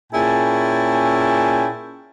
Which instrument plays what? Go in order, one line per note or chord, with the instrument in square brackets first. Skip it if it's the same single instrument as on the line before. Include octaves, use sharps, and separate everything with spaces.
[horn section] A#2 C#4 E4 G#4 G5 A5